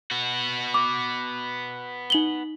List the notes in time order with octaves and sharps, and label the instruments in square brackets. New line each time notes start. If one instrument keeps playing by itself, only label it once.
[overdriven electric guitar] B3 F#4
[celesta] D6
D#4 F#7 G7